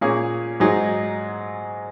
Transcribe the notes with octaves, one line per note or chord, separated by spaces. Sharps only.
A#2 A#3 C#4 G#4
G#2 F#3 D#4 G#4